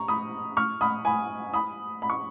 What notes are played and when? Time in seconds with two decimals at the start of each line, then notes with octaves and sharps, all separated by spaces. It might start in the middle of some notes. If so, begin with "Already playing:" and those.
Already playing: A#5 C#6
0.08 B5 D#6
0.57 C#6 F6
0.81 B5 D#6
1.05 G#5 B5
1.54 B5 D#6
2.02 B5
2.10 C#6